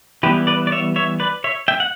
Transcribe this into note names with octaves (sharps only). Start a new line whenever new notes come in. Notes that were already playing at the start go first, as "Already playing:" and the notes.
E3 G3 B3 G4 B4
B4 D5
D5
C#5 E5
C#5 E5
B4 D5
C#5 E5
E5 G5
F#5